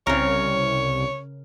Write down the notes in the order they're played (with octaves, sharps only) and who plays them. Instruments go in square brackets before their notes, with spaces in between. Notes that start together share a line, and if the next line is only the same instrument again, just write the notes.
[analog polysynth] C2 [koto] C#3 A#4 [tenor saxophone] C#5